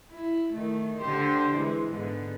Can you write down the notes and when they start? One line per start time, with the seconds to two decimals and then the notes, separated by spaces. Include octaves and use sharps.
0.11 E4
0.53 D#3 A3
1.00 D3 G4 C5
1.52 E3 G#3
1.90 G#2 D3 B3